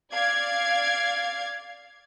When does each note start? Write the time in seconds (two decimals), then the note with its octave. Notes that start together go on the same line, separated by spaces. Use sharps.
0.12 D5 F5 G#6